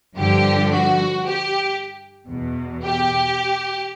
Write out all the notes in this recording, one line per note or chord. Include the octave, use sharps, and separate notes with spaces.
G2 D3 F3 G4
F#4
G4
E2 B2
G4